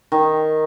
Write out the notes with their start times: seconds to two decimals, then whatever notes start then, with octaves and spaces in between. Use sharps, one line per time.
0.12 D#3